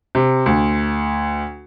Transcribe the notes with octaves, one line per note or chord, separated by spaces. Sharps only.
C3
D2